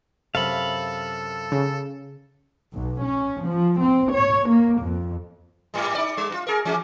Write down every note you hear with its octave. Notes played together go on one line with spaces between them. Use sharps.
F#2 C3 A4 F5 B5
C#3
B1
C#4
F3
C4
C#5
A#3
F2
G#2 G3
D#4 D5
G3
G2 F4
G#4 A#4
E3 G#3 C#4